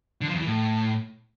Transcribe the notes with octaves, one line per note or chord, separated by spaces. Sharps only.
D3
F3
E2
E3
A2